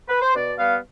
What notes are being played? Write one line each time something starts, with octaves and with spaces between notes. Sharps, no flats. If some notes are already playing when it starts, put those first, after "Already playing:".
B4
C5
B2 D5
G3 B3 F5